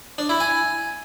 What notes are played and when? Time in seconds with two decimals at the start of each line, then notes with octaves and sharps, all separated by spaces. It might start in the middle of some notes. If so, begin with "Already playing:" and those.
0.18 D4
0.29 E4
0.40 G#5